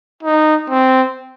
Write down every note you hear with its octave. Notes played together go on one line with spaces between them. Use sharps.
D#4
C4